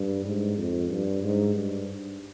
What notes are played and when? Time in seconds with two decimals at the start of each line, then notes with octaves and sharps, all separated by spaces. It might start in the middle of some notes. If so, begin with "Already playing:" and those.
Already playing: G2
0.25 G#2
0.57 F2
0.90 G2
1.22 G#2
1.55 G2